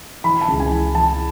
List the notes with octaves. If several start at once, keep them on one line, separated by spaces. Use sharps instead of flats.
E3 B5
A5
C#2
G#5
E3
E3 A5